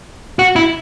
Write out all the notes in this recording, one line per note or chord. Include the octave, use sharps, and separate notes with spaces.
F#4
E4